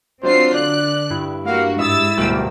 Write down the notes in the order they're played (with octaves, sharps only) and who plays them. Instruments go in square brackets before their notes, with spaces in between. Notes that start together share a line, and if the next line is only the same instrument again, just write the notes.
[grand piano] F#3 D4 [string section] C4 F4 C7 [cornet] C5
[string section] D3 F#6 [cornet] D5
[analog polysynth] G2 [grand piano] E4
[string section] A#3 F#4 [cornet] F5
[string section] G#2 E6 A6 [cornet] E4 [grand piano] E5 D#6
[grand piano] D1 B2 D7 [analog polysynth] G3 A#3